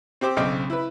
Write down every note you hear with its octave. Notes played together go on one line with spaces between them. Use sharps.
C4 G4 C5 D6
B1 C#3 C4 D#5 G5 D6
E4 B4